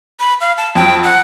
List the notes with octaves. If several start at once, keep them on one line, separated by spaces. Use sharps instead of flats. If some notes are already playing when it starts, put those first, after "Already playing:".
B5
F5
A5
F2 F#3 G5
F#5